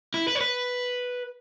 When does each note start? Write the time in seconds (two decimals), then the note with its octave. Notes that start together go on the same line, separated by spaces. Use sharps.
0.14 E4
0.28 B4
0.35 C#5
0.41 B4